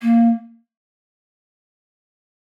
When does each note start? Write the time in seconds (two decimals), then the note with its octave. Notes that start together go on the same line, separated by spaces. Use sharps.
0.02 A#3